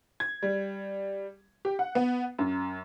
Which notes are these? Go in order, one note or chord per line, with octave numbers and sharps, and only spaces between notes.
G#6
G3
G4
F#5
B3
F#2